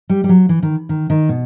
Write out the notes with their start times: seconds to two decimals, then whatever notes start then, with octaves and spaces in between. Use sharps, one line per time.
0.10 G3
0.24 G3
0.29 F#3
0.49 E3
0.63 D#3
0.89 D#3
1.10 D#3
1.29 B2